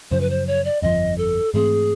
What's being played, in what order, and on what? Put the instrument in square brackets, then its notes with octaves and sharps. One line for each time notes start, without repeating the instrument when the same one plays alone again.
[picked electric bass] F#2 C#3 F3 [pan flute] C5
[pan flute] B4
C5
C#5
D5
[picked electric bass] G1 F2 C3 F3 [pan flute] D#5
[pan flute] A4
[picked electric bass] G#2 E3 A3 C4 [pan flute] G#4